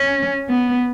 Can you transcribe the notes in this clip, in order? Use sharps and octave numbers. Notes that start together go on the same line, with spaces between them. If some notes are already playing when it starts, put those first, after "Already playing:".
Already playing: C#4
B3